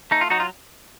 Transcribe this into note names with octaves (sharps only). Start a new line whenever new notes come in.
A3 D#4
F4
F#3 D#4 F#4
F4